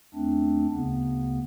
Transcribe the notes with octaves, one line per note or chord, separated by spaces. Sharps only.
E2 A3 C4 D4
D2 C#3 B3